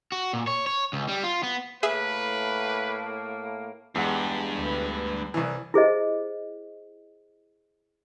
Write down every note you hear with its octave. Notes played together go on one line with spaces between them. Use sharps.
F#4
A#2
C#5
C#5
C#2
G3
F4
B3
A2 A#3 G#4 B4 E5
E2 G2 G#3 F#5
D2 B4
C2 E3
E4 G#4 C5 D#5